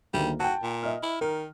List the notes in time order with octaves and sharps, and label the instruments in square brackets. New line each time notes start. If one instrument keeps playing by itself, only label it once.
[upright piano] D2 D#3 A#3 [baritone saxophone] G3
[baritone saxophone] F#4 [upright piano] G5 A5
[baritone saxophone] A#2
[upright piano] D#5 E5 F6
[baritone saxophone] E4
[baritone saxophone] D#3 [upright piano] A#4